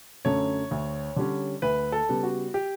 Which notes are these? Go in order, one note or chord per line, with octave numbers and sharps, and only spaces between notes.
F#2 D3 A3 C#4 C#5
D2
D3 G3 C#4
D2 B4
A4
C#3 G3 B3
F#4
G4